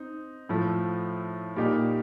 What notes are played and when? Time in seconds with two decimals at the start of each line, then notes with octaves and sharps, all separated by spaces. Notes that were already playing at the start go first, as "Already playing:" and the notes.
Already playing: C4 D#4
0.49 A2 F3 A3
1.56 A#2 G3 A#3 D#4 G4